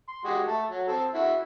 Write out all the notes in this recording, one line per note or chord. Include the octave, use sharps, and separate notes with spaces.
C6
G#3 F#4 G4
A3 A4
F#3
C4 A4
E4 F#4